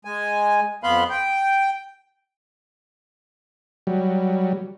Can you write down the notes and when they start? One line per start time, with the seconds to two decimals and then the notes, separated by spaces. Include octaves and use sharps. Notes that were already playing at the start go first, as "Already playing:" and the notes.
0.05 G#3 G#5
0.84 F2 B3 F5 B5 C6 F#6
1.10 G5
3.87 F#3 G3